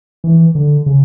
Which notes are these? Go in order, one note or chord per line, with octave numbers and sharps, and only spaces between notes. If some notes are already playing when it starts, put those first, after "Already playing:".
E3
D3
C#3